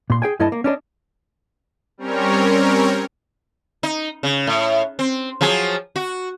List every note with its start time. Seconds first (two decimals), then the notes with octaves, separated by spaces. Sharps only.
0.10 A#2 C6
0.22 G#4 G5 G#5
0.40 G2 E4 A4 D#5 G#5 A5
0.52 A#3
0.64 C#4 D4 A#4 D#5
1.98 G3 C4 C#4 A#4 C#5
3.83 D#4
4.23 C#3
4.47 A2
4.99 C4
5.41 F3 F#3 G#4
5.96 F#4